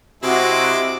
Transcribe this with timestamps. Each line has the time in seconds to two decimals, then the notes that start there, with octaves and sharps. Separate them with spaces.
0.23 C3 G#3 E4 F#4 D6